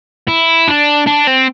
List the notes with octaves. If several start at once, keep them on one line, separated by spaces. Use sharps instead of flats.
E4
D4
D4
C4